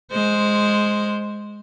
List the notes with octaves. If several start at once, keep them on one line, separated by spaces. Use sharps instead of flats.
G#3 C5